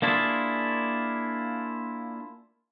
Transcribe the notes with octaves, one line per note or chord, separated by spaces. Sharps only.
A#3 D4 E4 F4 G#4